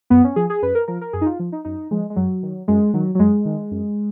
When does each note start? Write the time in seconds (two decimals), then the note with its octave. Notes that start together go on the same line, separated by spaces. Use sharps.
0.10 F#2 B3
0.24 C#4
0.36 F3 G#4
0.50 G#4
0.62 F#2 B4
0.75 A#4
0.88 F3 A#4
1.01 A#4
1.13 F#2 G#4
1.21 D#4
1.26 F4
1.39 F3
1.52 D#4
1.65 F#2 D#4
1.91 F3 G#3
2.10 G#3
2.16 F#2 F#3
2.43 D#3
2.68 F#2 G#3
2.94 D#3 F#3
3.15 F#3
3.19 F#2 G#3
3.45 D#3
3.71 F#2